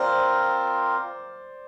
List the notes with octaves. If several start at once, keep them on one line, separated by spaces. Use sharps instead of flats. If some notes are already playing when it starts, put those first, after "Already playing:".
Already playing: C4 F4 A#4 C5 D5